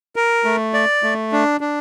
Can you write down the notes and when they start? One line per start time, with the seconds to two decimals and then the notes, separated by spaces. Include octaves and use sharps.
0.16 A#4
0.45 A3
0.74 D5
1.03 A3
1.32 D4
1.61 D4